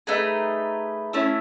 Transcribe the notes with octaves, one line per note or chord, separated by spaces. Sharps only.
A3 D#4 G#4 B4
A3 C#4 E4